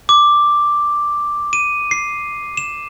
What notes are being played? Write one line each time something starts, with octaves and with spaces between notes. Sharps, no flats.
D6
D#7
C7
E7